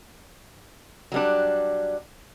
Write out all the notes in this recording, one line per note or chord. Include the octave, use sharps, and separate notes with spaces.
F#3 G3 D4